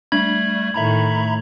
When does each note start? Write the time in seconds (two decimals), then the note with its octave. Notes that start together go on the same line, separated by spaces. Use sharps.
0.12 G3 A3 D4 G#6 F#7
0.74 A2 D#3 A3 E5 A#5 B5